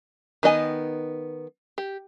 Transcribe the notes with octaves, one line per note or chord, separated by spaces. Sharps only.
D#3 B3 D#5 G#5
G4